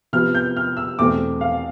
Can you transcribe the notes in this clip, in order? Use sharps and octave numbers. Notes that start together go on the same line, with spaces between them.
C3 F3 B3 F6
G6
F6
E6
E2 B2 A3 C4 D6
F5